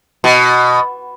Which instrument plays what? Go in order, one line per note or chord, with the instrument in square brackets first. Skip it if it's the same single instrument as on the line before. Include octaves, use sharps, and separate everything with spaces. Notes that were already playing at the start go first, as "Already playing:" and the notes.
[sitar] B2